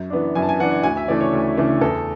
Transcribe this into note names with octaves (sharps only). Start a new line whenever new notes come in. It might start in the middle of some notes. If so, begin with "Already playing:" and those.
Already playing: F#2
E3 B3 D4
F#2 G#5
A5
G#5
E3 B3 D4 F#5
D2 G#5
E5
C#3 E3 A3 D4 D5
C#5
D2
C#3 E3 A3 D4
E2 A4